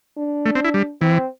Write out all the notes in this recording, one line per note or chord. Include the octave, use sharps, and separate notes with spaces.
D4
A3
C4
E4
G3
E3 C4